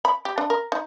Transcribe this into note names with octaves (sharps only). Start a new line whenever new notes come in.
B5
G4
D4
A#4
D#4